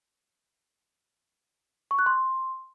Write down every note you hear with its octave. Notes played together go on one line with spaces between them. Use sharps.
C#6
F#6
C6